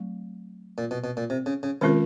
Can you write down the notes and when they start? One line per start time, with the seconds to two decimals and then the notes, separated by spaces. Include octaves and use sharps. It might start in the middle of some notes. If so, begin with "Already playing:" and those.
Already playing: F#3 A3 C4
0.78 A#2
0.91 B2
1.04 B2
1.17 A#2
1.30 C3
1.46 C#3
1.63 C#3
1.81 C3 D#3 G#3 C#4 F4 A#4